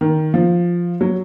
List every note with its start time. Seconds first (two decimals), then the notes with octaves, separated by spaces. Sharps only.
0.01 D#3
0.34 F3
1.01 F#3